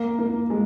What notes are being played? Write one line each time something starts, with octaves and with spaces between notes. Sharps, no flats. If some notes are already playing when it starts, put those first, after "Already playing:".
Already playing: A#3
A#3
G#3